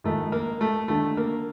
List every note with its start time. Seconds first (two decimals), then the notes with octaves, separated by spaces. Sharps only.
0.04 A#1 G#2 D#3 A3
0.32 A#3
0.61 A3
0.88 D#2 D3 A3
1.17 A#3